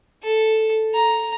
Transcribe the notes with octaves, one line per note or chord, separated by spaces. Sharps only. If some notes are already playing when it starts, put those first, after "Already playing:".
A4
A#5